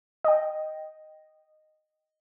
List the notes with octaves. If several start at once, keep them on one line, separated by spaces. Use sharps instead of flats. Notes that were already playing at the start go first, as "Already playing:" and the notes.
D#5 G5